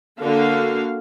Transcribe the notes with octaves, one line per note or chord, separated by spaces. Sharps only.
D3 A#3 F#4 F5